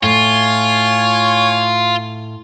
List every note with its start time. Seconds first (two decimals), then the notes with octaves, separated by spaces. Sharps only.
0.03 A2 F4 C#5 G#5